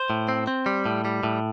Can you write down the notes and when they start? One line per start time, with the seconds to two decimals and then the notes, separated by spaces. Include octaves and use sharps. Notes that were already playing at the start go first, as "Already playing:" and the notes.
Already playing: C5
0.10 A2
0.28 C4
0.47 C4
0.66 G3
0.86 A2
1.05 G3
1.23 A2